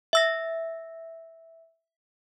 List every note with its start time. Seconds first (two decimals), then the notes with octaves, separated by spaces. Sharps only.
0.13 E5 E6 A#6